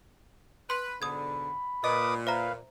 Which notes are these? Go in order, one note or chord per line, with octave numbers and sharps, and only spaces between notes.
B4 C6 F#6
G#2 B2 D3 B5 D#6 G#6
A#2 B4 D#5 D6 D#6
B4 C5 E5 F5 A#5